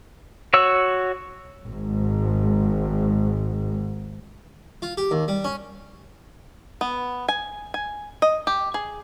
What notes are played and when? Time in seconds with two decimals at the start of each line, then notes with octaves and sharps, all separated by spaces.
0.54 F#4 C#5 E6
1.66 G#1 G#2
4.82 F4
4.97 G4
5.11 D#2
5.28 G3
5.44 C#4
6.81 B3
7.29 G#5
7.74 G#5
8.22 D#5
8.47 G4
8.74 G#4